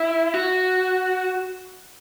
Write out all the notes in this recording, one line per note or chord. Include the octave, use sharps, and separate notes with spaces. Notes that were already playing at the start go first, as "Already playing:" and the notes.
Already playing: E4
F#4